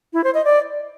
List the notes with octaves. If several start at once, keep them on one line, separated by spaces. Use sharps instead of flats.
E4
C5
D#5
D5